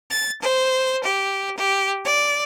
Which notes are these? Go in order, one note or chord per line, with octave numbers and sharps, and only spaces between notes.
A6
C5
G4
G4
D5